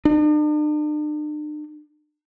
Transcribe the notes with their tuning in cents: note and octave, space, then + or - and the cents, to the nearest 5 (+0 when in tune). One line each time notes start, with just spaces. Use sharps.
D4 +45